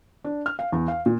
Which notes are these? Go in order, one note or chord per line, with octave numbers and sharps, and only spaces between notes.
D4
F6
F5
E2
F5
A#2